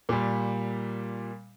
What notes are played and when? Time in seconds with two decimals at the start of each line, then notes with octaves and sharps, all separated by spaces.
0.09 A#2 G3